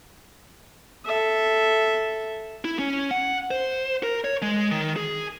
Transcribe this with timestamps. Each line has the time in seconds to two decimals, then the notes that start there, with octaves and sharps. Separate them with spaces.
1.06 A4 E5
2.65 E4
2.79 C#4
3.11 F#5
3.51 C5
4.03 A#4
4.24 C#5
4.42 G#3
4.71 D#3
4.96 G#4